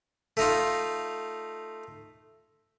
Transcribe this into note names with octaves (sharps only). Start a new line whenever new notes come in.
A3 D#4 F4